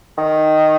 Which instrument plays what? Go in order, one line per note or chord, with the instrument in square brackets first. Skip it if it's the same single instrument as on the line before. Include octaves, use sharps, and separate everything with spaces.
[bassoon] D#3